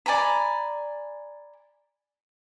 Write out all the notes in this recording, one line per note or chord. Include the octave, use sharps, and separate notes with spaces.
D5 G#5 A#5 B5